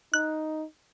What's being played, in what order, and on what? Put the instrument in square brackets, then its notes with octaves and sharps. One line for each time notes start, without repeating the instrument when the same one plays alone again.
[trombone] D#4 [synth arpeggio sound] F#6